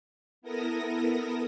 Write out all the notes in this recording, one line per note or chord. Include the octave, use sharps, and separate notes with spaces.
B3 E4 A4 A#4 D#6 A#6